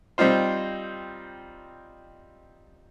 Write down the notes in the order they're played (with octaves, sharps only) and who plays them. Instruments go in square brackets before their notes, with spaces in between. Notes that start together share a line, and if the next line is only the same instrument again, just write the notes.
[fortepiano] G3 C4 D#4 F4 C5